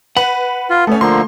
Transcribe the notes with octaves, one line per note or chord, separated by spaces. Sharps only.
B4 F#5
F4
A3 B3 C#4 A4
D3 F3 A#3 C6